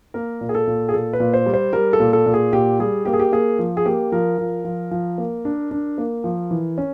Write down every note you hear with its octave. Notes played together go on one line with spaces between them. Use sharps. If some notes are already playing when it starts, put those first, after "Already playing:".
A#3 A#4
A#2
G#4
A4
A#2
G#4
A#2 A4
B4
A#2
C5
G3
C5
G3 A#4
A4
A#2
A4
A#2
G#4
A#2 G4
G3 G#4
A#3 G4
G#4
G4
A#3 G#4
F3
G#4
A#3 G4
F3 A#4
F3
F3
F3
A#3
D4
D4
A#3
F3
E3
C#4